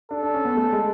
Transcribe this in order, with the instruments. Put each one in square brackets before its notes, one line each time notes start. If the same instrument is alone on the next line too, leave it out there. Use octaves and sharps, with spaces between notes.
[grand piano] D4 [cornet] A4
[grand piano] D4
C#4
B3
A3
G#3